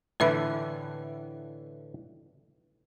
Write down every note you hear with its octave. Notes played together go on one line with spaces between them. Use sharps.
A2 D3 E3 B4 E5 B5